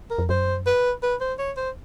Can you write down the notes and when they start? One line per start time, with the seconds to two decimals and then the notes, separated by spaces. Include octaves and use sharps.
0.10 A#4
0.19 F2
0.29 F#2 C5
0.66 B4
1.03 B4
1.20 C5
1.38 C#5
1.57 C5